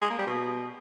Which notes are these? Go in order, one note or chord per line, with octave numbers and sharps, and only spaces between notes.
G#3
A#3
G3
B2